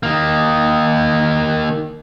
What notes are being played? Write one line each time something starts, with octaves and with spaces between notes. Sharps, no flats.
D#3 A#3